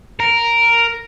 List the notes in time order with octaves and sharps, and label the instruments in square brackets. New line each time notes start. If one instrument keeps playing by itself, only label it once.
[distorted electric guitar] A#4